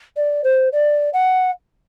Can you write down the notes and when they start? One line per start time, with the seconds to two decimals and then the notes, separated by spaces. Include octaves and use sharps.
0.16 D5
0.43 C5
0.72 D5
1.13 F#5